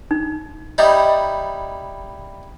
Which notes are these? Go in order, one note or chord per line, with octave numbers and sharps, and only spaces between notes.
D#4
G3 D#4 E4 D#5